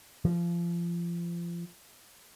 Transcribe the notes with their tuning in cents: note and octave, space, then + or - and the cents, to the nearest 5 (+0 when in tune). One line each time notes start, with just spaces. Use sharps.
F3 -30